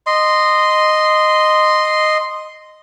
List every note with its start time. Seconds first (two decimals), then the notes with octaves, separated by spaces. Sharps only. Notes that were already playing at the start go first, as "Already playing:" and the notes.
0.07 D#5 C6